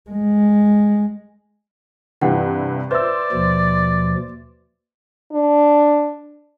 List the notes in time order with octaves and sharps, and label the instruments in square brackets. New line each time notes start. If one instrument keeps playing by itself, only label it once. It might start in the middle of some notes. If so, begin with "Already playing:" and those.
[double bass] G#3
[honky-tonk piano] G2 C3 E3 [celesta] B4 F#5 G5
[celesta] B4 E5 [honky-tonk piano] C5 E6 [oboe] D5
[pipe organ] D#2 B2 F3
[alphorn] D4